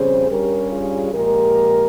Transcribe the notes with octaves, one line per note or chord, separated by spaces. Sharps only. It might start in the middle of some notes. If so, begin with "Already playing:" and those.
Already playing: F2 C#3 G3 C#4 G#4 C5
G2 G3 C#4 G4 A#4
F4 G#4
A#2 F3 G#3 G4 A#4